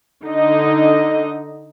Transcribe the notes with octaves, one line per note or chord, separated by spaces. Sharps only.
D3 D#4 D#5